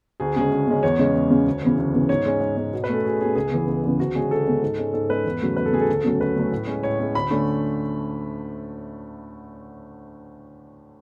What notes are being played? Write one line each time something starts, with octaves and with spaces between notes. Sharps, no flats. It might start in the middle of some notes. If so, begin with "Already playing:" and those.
D2 G#4
C#3 G#3 C#4 G#4
D2
C#3 G#3 C#4
E2 C#5
C#3 G#3 C#4
E2
C#3 G#3 C#4
D2
C#3 E3 B3
D2
C#3 E3 B3
G#2 C#5
G#3 C#4
G#2
G#3 C#4
B2
B4
A3 C#4 A4
B2 G#4
A3 C#4 G#4
C#2 G#4
C#3 E3 B3
C#2
C#3 E3 B3
D2 F#4
C#3 G#3 C#4 G#4
D2 A4
C#3 G#3 C#4
G#2
G#3 C#4
G#2 A4
G#3 C#4 B4
E2
C#3 F#3 A3
E2 B4
A4
C#3 F#3 A3 G#4
A4
D2
C#3 F#3 A3 C#4
D2 B4
C#3 F#3 A3 C#4
A2
G#3 C#4
A2 C#5
G#3 C#4
D2 B5
D3 A3 C#4